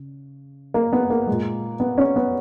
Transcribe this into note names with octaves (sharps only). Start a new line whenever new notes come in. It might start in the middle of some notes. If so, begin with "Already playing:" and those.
Already playing: C#3
A#3
B3
A#3
A#2 G#3
B3
C#4
B3